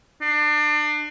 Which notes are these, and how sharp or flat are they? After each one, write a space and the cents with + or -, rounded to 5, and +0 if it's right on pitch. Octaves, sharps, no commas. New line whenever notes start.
D4 +30